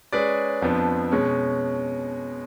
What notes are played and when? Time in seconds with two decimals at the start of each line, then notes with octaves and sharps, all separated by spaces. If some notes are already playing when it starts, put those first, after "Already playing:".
0.12 G#3 C#4 G#4 B4 D5
0.62 F2 F3 B3 D4
1.12 B2 G#3 C#4